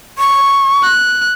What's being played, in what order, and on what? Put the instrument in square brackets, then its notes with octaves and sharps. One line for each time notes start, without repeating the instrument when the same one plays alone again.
[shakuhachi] C#6
[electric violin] F#6